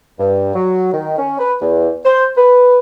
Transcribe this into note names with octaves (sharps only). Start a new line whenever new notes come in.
G2
F#3
D#3
C#4
B4
E2
C5
B4